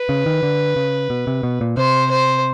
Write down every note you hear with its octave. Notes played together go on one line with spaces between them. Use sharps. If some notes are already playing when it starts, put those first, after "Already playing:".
Already playing: B4
C#3
D#3
D3
C#3
B2
C3
B2
A#2
C3 C5
C5